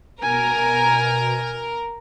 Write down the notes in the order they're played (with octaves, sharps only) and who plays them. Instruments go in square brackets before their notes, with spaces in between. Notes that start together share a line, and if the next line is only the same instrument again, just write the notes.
[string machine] B2 [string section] A#4 [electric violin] G#5